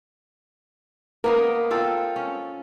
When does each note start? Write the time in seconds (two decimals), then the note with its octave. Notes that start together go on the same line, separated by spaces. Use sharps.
1.24 A#3 B3 A#4 D#5
1.70 C4 F4 A4
2.16 C#4